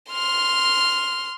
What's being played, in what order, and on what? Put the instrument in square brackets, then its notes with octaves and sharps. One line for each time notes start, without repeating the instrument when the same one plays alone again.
[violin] C6 F6